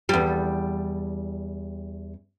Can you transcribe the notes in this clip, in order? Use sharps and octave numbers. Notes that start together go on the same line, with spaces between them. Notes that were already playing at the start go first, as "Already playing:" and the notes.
E2 G3